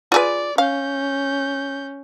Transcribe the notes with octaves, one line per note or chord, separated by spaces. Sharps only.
F4 G#4 B4 D5
C#4 F5 G6